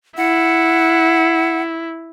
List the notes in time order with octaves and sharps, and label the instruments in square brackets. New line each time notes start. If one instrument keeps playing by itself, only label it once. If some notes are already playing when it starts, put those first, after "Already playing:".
[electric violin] E4 [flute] F#5